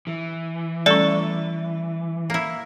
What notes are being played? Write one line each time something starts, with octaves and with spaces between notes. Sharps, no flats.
E3
G3 A3 C#4 A4 D5 C#6
A#3 E4